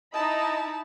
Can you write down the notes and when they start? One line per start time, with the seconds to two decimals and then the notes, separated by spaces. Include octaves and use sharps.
0.14 D#4 E4 D#5 A5 B5